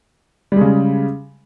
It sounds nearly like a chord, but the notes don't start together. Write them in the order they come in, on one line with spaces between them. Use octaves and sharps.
G3 G#3 C#3